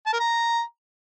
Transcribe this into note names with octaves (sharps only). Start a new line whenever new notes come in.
A5
A#4
A#5